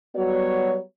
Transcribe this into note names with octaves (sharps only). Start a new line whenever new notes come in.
F#3 G3 B3 F#4 C#5